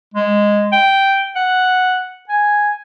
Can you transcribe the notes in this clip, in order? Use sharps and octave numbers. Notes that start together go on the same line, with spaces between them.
G#3
G5
F#5
G#5